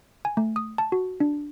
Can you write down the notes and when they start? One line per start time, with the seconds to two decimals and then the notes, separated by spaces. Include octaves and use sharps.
0.25 G#5
0.37 A3
0.56 D#6
0.78 A5
0.92 F#4
1.20 D4